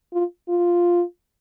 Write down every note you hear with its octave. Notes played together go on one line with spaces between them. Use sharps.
F4
F4